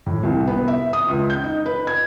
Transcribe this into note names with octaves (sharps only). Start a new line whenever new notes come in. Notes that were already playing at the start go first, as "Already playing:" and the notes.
A2
C2
B3
E5
D#6
C#2
G6
D#4
B4
G#6